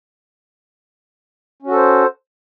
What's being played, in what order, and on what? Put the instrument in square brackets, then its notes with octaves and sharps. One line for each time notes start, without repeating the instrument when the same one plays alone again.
[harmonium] C#4
F#4
A4
C5